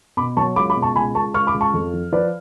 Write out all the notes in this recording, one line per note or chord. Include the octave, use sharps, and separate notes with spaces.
B2 B5 D6
F#3 A5 C#6
C#2 B5 D6
B5 D6
B2
A5 C#6
C#2 G#5 B5
C#2 A5 C#6
C#2 C#6 F6
B5 D6
C#2
A5 C#6
F2
F3
F3 B4 D5